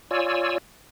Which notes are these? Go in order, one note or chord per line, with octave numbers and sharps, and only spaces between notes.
F4 C#5 D5 G#5 E6